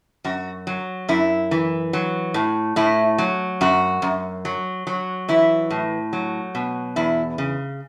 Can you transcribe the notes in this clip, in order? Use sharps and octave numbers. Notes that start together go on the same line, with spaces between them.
F#2 F#4
F#3
F#2 E4
E3
F#3
A2
A2 E4
F#3
F#2 F#4
F#2
F#3
F#3
E3 E4
A2
F#3
B2
E2 E4
C#3